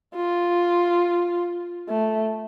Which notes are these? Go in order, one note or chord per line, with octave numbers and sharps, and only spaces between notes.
F4
A3